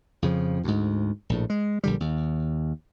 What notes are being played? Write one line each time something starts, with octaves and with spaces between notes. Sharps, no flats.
F2 C#3 F3
D2 G#2
A#1 A2
G#3
A#1 D3 G3
D#2